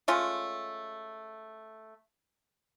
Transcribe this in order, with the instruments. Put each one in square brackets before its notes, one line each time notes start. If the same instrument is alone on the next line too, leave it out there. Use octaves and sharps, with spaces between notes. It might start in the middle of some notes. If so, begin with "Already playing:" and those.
[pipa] G#3 A3 C#4 F4